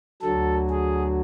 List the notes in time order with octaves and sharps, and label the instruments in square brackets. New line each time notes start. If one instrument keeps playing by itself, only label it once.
[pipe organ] D2 D3 F#3 A4
G#4